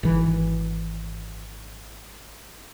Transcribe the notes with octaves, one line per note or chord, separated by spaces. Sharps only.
G#1 E3